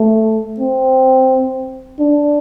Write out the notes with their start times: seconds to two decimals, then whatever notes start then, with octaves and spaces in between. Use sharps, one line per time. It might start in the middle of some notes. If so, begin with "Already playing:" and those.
Already playing: A3
0.59 C4
1.99 D4